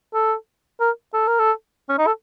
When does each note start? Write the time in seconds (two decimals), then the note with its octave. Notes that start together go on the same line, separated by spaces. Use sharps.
0.14 A4
0.80 A#4
1.14 A4
1.27 A#4
1.39 A4
1.89 C#4
1.98 D#4
2.07 A4